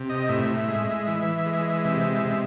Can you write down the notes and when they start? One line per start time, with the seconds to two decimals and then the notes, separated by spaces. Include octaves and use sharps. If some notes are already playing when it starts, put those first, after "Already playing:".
Already playing: C3
0.09 D#5
0.29 A2 E5
0.68 G#3
1.08 E3
1.46 G#3
1.85 C3
2.25 C3